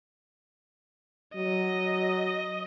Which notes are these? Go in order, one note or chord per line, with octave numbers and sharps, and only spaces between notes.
F#3 D#5